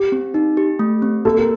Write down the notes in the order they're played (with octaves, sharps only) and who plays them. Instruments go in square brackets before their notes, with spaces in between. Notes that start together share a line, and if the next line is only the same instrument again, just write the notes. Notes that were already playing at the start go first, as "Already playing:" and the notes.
Already playing: [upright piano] G4
[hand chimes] C4
D#4
G4
A3
C4
[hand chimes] A#3 [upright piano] A4
[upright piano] A#4